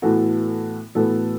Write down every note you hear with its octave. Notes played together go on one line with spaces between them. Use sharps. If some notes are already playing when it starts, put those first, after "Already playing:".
A2 E3 B3 F#4 A4
A2 E3 B3 F#4 A4